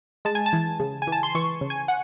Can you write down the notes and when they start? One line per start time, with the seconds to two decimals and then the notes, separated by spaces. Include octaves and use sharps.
0.25 G#3 A5
0.35 G#5
0.46 A5
0.53 E3
0.80 C#3
1.02 G#5
1.07 E3
1.12 A5
1.23 C6
1.35 E3 C#6
1.61 C#3
1.70 G#5
1.88 F#5